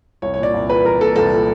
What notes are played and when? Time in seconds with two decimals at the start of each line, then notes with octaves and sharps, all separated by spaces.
0.22 C2 C#5
0.34 C#5
0.38 A#2 D5
0.54 C2
0.69 A#2 B4
0.85 C2 A#4
1.01 A#2 A4
1.16 C2 A4
1.32 A#2